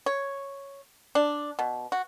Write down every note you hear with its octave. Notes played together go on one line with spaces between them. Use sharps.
C#5
D4
B2
F#4